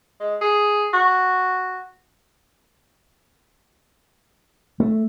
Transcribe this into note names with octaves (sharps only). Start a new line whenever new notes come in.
G#3
G#4
F#4
A3